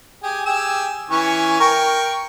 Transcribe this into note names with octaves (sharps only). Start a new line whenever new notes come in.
G4 G#4
G4 G#4 E6
E3 C#4 C#6
A#4 G5 C#6